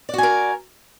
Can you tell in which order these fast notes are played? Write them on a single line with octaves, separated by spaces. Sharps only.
D5 F#4 G#5 A#4